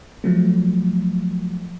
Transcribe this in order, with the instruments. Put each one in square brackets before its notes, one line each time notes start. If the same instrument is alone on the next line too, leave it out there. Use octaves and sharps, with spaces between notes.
[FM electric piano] F3 F#3 A3